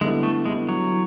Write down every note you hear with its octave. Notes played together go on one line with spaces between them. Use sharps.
D3 G3 G#3 B3 E4
A3
D3 G3 G#3 B3 E4
F#3
E3